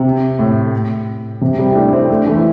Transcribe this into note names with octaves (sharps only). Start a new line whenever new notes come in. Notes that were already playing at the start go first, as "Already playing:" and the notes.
Already playing: C3
A2
C3
G3 C4
E4
A3 D4
C4 E4
A3 D4
E3 A3
E4